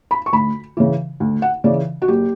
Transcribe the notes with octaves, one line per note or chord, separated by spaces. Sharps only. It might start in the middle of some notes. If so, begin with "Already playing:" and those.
B5
C#6
D2 B5
C#3 E3
D2
F#5
C#3 E3 D5
F#4
F#1 G4